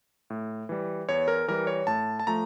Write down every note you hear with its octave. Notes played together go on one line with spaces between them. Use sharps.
A2
E3 G3
E2 C#5
A#4
E3 G3 A#4
C#5
A2 A5
A5
F3 A3 A#5